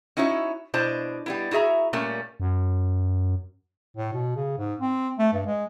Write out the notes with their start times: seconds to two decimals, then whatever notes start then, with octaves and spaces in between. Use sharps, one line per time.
0.17 C#4 D#4 E4 F#4 C#5
0.74 B2 D4 E4 C5 A5
1.26 G3 B3 E4
1.51 E4 F#4 G#4 E5 A#5
1.93 A#2 G3 A3 A#3 C#4
2.40 F#2
3.97 A2
4.13 B2
4.36 C#3
4.58 G#2
4.80 C4
5.19 A3
5.33 G2
5.46 G#3